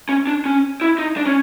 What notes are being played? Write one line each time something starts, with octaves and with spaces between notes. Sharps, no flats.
C#4
D4
C#4
E4
D#4
D4
C#4